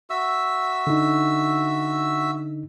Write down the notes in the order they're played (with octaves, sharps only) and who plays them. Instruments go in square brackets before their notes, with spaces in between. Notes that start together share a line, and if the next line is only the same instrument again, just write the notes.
[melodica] F#4 E5 E6
[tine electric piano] D3 D#4